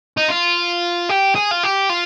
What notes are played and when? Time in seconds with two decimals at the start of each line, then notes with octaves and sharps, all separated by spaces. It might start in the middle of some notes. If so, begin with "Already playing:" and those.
0.17 D#4
0.29 F4
1.09 G4
1.35 G#4
1.51 F4
1.63 G4
1.90 F4